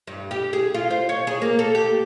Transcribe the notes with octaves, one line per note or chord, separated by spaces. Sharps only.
G2
G4
G#4
F4
C5
C#5
G#4
A#3
A4
G4